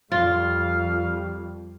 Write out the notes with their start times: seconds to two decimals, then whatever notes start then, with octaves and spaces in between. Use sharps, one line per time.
0.12 F2 G3 F4 F5